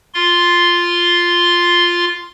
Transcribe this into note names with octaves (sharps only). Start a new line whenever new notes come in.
F4 C6